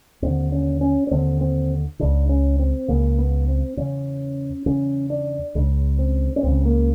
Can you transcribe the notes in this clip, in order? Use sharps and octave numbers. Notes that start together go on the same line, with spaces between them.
D#2 D3 C4
C#4
C#4
C#4
D#2 D3 C4
C4
C#2 C#3 D4
C#4
C4
C#2 C#3 A#3
B3
C4
E2 C#3 C#4
E2 C#3 C#4
D4
C#2 C#3
C4
C#4
C#2 C#3 C4
A#3